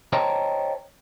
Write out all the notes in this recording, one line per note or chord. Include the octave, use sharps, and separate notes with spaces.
C5 C#5 D#5 G5 A5 A#5